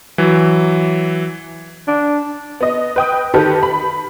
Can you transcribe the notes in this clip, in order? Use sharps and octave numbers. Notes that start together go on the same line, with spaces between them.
E3 F#3
D4
B3 D#5
B4 G5 D#6
D#3 G4 A4 B4
B5